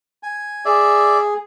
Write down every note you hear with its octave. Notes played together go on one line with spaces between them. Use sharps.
G#5
G#4 D5 E5